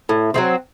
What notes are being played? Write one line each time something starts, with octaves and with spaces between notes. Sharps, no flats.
A2
F#3 A3 C4